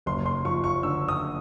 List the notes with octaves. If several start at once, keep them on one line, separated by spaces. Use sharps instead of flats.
F#1 C6
C6
F3 C#6
C#6
D3 E6
D#6